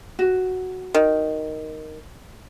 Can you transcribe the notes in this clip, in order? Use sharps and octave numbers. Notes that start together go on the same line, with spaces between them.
F#4
D#3